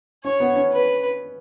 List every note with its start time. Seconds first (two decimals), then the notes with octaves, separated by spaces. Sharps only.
0.24 C#4 C#5
0.40 B3
0.56 C#4
0.72 B4